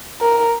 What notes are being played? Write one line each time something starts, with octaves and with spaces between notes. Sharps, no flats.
A#4